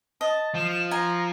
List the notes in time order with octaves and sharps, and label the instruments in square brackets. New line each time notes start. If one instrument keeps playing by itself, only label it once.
[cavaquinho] D#5 [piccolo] A5
[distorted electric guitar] F3 [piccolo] E7
[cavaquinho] G#5 [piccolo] A#5